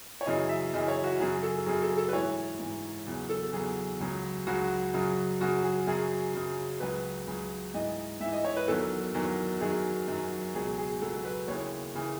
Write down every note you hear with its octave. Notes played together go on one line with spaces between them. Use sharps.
C#5
F#2 C#3 E3 D#5
E5
F#2 C#3 E3 D#5
C#5
F#4
F#2 C#3 F#3 G#4
A4
F#2 C#3 F#3 G#4
A4
A4
B4
G#2 E3 C#5
G#2 E3
E2 C#3 F#3
A4
E2 C#3 F#3 G#4
C#2 C#3 F#3
C#2 C#3 F#3 F#4
F#2 C#3 F#3
F#2 C#3 F#3 F#4
G#4
F#2 C#3 F#3 G#4
F#2 C#3 F#3
C#2 C#3 F#3 B4
C#2 C#3 F#3
G#2 E3 D#5
G#2 E3 E5
D#5
C#5
B4
E2 D#3 F#3 A4
E2 D#3 F#3
F#2 D#3 F#3 G#4
F#2 D#3 F#3
C#2 B2 F#3 G#4
G#4
C#2 B2 F#3 A4
B4
D#2 C#3 E3 C#5
D#2 C#3 E3